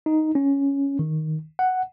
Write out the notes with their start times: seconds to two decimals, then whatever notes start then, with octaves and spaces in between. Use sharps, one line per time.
0.06 D#4
0.35 C#4
0.99 D#3
1.59 F#5